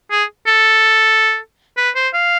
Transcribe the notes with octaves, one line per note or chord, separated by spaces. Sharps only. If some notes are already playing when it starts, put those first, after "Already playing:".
G#4
A4
B4
C5
F5